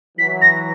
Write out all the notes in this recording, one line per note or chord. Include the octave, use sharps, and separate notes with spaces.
E3 F#3 B6
A#6